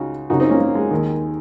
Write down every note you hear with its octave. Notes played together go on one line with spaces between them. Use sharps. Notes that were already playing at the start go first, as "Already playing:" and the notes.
Already playing: C#2 C#3 D#4 F#4
F#2 C#3 D#4 F#4
C4 D#4
A#3 C#4
A#3
G#3
D#2 D#3